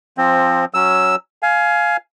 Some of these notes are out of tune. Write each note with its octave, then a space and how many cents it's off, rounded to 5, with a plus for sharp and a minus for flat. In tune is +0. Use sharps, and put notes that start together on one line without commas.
F3 +0 C4 +15
F#3 +0 C#4 +5 E6 +0
F5 +0 G#5 +20